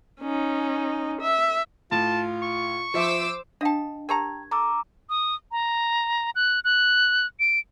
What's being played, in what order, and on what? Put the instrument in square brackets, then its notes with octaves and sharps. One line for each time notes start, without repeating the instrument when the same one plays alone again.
[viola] C#4 D#4
E5
[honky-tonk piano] A2 [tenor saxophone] F4 [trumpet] A5
[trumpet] C#6
[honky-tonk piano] F3 E5 [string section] C5 D6 E6
[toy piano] D4 F5 G5 [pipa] D#5 A5
[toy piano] G4 A#4 [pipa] G5 A5 A#5 [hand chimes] G#6
[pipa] A4 [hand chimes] A#5 D6 E6
[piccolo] D#6
A#5
F#6
F#6
D7